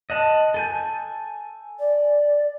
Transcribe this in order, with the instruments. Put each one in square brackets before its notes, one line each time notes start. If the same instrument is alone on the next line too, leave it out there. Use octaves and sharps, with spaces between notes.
[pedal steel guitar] D#5 F#5 A5
A4 G#5 G6
[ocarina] D5